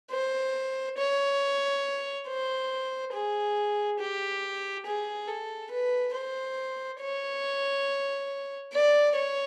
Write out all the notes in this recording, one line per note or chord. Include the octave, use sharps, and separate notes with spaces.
C5
C#5
C5
G#4
G4
G#4
A4
B4
C5
C#5
D5
C#5